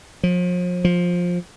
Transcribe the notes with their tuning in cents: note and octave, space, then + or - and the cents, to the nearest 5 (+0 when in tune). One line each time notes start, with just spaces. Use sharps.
F3 +40
F3 +15